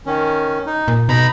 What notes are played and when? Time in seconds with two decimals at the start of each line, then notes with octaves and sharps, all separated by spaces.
0.06 D#3 C#4
0.66 D#4
0.88 A#2
1.09 B2 D#4 A#5 B5